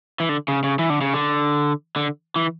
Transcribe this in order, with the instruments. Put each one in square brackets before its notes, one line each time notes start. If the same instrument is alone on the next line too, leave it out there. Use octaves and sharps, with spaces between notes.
[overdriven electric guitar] E3
D3
C#3
C#3
E3
D3
C#3
D3
D3
E3